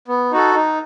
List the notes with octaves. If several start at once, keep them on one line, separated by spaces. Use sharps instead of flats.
B3
D#4 F#4 A4
D#4